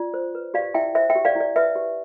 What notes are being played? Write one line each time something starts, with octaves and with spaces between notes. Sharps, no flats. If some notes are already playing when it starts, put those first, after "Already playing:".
Already playing: F4 D5
C5
B4
G4 D5 F5
E4 E5 G5
C5 E5
E5 G5
G4
D5 F5
E4 D5
B4 E5
G4